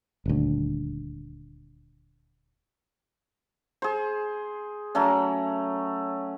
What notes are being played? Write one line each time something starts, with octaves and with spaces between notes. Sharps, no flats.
D#1 D2
G#4 C5
F#3 A3 C#4